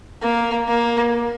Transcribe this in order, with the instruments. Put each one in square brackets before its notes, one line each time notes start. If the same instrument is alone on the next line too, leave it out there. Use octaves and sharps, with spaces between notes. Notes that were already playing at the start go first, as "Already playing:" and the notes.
[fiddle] A#3
A#3